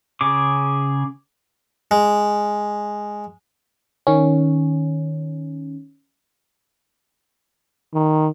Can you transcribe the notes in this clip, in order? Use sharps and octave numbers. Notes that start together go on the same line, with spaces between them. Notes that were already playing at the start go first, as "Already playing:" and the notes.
C#3 G#4 D6
G#3
D#3 C#4
D#3